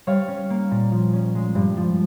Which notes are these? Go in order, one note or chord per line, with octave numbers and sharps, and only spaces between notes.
G3 C#5 F5
C#4
A#3
A#2
F3
C#4
G#3
G2
F3